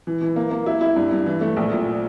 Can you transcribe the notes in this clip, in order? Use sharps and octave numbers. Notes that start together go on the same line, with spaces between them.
E3
E3
A#3
A#3
E4
E4
G2
G2
E3
A3
A#1
A#2